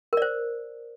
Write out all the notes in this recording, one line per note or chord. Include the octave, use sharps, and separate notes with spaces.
A#4 C5 D5